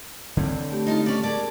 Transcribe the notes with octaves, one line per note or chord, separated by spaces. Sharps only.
D3 C4
A3 G4
D#4 F4 A4
C#4 D5
G#4 A#4 D5 A5